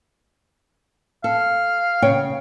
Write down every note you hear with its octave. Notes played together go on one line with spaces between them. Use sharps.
A4 F5
C#3 C#5 G5